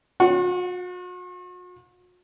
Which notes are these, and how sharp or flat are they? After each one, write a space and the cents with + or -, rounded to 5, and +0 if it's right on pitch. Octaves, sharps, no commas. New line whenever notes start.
F#4 -45 F#5 +0